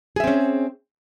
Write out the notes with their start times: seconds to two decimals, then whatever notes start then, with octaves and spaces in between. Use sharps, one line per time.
0.16 G#4
0.20 E5
0.24 C4
0.27 C#4